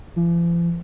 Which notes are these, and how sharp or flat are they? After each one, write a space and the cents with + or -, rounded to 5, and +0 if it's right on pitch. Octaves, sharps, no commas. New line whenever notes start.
F3 -45